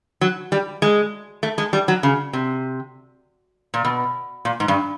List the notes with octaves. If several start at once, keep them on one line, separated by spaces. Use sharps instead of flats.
F#3
G3
G#3
A3
G#3
G3
F#3
C#3
C3
A#2
B2
A#2
G#2
G2